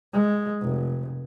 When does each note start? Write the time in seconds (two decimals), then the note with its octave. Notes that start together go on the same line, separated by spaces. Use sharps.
0.14 G#3
0.62 F1